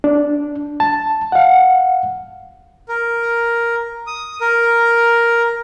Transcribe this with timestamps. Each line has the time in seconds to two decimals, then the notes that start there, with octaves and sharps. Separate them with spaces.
0.04 D4
0.80 A5
1.32 F5 F#5
2.89 A#4
4.07 D#6
4.41 A#4